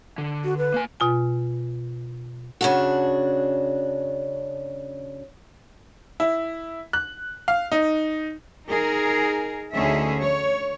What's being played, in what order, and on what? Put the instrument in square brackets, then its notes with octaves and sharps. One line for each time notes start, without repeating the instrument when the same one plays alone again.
[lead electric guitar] D3
[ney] F#4
B4
[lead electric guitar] A#3 G#5
[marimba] B2 F4 G#5
[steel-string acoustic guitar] C#3 D4 F#4
[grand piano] E4
F#6
F5
D#4
[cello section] D#4 G#4 A#4
D2 D3 C#4 D#4 G#4 E5
C#5